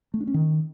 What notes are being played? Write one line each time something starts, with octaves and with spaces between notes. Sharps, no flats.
A3
D4
C#4
D#3